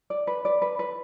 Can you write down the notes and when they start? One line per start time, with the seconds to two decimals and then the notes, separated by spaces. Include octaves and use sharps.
0.10 D5
0.27 B4
0.45 D5
0.62 B4
0.79 B4